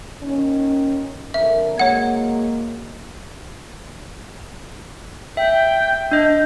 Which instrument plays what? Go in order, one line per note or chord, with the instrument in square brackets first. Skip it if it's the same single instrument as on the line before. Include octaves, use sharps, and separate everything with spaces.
[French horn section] D#2 D#3 C#4
[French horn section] F2 D3 A#4 [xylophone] E5
[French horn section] F#3 G#3 A#3 [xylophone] C#5 F#5 G#6
[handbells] E5 [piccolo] G5
[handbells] D4 D#5 [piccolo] G6